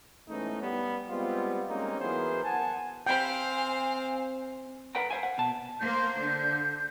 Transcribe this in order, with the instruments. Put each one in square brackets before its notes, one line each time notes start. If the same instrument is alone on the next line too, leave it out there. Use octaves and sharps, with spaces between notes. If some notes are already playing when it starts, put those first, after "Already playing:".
[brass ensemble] E2 G#2 E3 A3 C#4 D#4
G3 B3
G3 G#3 B3 C4 F4
G3 G#3 A#3 C4 C#4 D#4
E3 F#3 B3 G#4 A#4 C5
F#5 G#5 A5
[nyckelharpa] C4 [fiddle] C5 F5 [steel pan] G5 B5 [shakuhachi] G#5
[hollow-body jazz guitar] A#4 B4 F#5 G5 A#5
C5 F5 G#5
F#5
B2 A5
[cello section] A#3 C5 [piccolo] G6
[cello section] D3